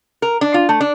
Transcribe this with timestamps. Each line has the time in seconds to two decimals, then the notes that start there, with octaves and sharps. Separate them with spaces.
0.22 A#4
0.41 D4
0.54 F4
0.69 A3
0.81 D4